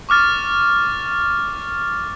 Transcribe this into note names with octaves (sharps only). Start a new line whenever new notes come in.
C#6 D6 F6 A6